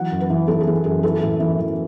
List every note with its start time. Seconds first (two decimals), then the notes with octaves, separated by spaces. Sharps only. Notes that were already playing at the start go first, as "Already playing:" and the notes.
Already playing: E3 F#3 F#5
0.11 F#2
0.21 B4
0.30 E3
0.48 E3 A4
0.61 G#4
0.67 E3
0.84 F#2 G#4
1.03 E3 A4
1.22 A2
1.40 E3
1.59 E3